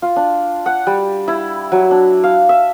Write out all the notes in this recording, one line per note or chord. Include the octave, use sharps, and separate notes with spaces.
F4
D4
F#5
G3
E4
F#3
D4
F5
E5